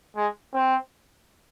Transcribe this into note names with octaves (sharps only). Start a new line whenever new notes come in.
G#3
C4